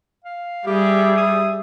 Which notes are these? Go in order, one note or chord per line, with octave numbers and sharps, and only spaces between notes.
F5
G3 G4 G#4 E5
D#6